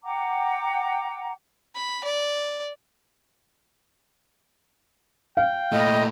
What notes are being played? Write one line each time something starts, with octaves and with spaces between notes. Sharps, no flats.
F#5 G5 A#5 D6
B5
D5
F5 G5
A#2 A3 D#5